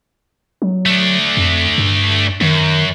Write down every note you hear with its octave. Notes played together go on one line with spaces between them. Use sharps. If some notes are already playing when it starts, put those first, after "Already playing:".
F#3
A3 D4
F2
G2
F#2 D#3